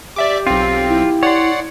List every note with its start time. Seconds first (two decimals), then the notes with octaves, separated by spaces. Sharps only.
0.16 G4 D5 E5 D6
0.47 B1 C4 F4
0.88 E4
1.23 C#5 D5 F#5 C6